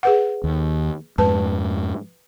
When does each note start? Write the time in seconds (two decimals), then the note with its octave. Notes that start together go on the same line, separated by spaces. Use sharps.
0.03 G#4 B4 F#5
0.44 D#2
1.18 F2 G#2 G#3 B4 A5